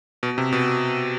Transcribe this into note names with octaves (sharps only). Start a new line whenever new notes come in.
B2
C3
B2